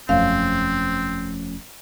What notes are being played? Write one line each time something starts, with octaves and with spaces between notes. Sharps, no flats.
E1 F#2 F3 A3 C4 C#4 F5